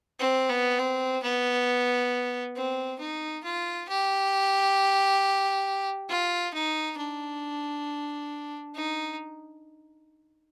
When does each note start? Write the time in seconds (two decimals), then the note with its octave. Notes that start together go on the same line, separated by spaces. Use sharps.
0.20 C4
0.49 B3
0.79 C4
1.23 B3
2.56 C4
3.00 D#4
3.44 F4
3.89 G4
6.09 F4
6.54 D#4
6.98 D4
8.75 D#4